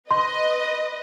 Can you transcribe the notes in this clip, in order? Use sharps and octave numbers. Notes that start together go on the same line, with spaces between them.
B4 D#5 C6